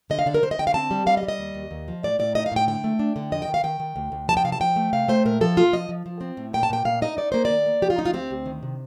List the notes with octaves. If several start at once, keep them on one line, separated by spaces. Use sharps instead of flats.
D3 D#5
F5
D3 D5
A#4
D3 C5
D#5
D3 G5
F5
C4 A5
G3
G3 F5
D#5
G3
D#5
D#2
D#2
D#2
F3
A2 D5
A2 D5
D#4 D#5
F5
A2 G5
D3 G5
A3
D4
D3
F2 D#5
G5
D#3
F5
D#3 G5
D#3
D2
D2
F3 A5
G5
C3 F5
A5
F3 G5
A3
C3 F5
A3 C5
A#2 A#4
F3 A4
A#2 F4
F3 D#5
F3
F3
C4
A2
A#2 G5
A5
A#2 G5
A#2 F5
D#4 D#5
D#4 D5
A#3 C5
D5
D#3
A#3
F3 G4
F4
D2 D#4
F4
C4 G4
D2
D#3
C3